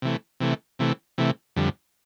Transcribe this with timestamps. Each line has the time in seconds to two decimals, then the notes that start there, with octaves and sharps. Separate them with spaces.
0.02 C3 E3 A3
0.40 C3 E3 A3
0.79 C3 E3 A3
1.18 C3 E3 A3
1.56 F2 D3 G3